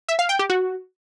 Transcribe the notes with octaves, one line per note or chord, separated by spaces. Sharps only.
E5
F5
G5
G4
F#4